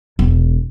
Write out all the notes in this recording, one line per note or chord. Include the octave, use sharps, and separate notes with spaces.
E1